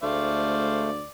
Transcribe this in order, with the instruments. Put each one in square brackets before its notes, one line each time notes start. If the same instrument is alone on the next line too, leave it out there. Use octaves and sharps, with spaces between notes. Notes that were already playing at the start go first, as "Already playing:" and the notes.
[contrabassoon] D2 [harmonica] G#3 C5 F5 [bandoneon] A3 [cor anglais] D5